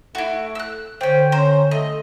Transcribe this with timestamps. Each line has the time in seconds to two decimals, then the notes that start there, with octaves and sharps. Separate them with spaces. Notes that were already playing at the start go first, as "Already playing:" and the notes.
0.15 A3 E4 F#4
0.55 E6 F#6
1.01 D3 C#4 C5 G5
1.32 C#4 C5 A#5
1.71 A3 D#5